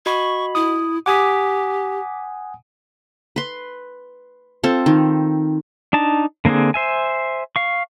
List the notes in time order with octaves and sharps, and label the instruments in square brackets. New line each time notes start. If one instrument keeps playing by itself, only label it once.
[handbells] F#4 D#5 B5 [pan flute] C#6
[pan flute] E4 [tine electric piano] D#6
[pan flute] G4 [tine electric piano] F#5 G#5 D#6 [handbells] D6 B6
[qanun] B4 C6
C4 F4 A4
D#3
[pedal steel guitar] D4 D#4 A5
D3 A#3 C4 D4 G#4
C5 E5 G#5
F5 C#6